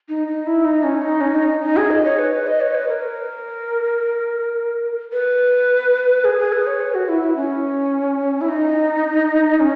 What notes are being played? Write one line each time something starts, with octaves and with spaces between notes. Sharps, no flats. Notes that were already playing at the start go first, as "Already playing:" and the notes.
D#4
D#4
E4
D#4
C#4
D#4
C#4
D#4
D#4
G#4
D#5
C#5
B4
B4
D#5
C#5
B4
A#4
B4
G#4
G#4
B4
C#5
B4
F#4
E4
E4
C#4
E4
D#4
C#4